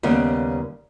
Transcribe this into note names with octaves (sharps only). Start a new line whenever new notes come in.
D#2 C#3 G3 B3